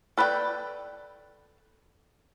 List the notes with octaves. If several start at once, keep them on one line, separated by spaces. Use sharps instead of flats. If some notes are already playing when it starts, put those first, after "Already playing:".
A4 B4 D5 D#5 G5